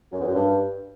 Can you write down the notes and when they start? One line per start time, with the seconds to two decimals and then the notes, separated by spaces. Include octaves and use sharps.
0.12 F#2
0.20 E2
0.27 F#2
0.35 G2